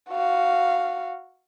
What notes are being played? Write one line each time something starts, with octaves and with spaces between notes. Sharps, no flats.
F#4 F5